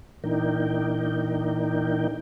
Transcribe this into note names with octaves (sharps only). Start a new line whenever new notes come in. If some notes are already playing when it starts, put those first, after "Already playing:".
A#2 E3 D4 D#4 A#4 G5